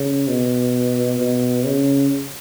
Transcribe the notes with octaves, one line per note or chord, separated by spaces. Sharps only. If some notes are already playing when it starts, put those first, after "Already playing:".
Already playing: C#3
B2
B2
C#3